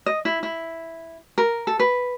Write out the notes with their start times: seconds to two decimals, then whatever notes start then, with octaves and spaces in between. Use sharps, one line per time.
0.06 D#5
0.25 E4
0.43 E4
1.38 A#4
1.67 A4
1.80 B4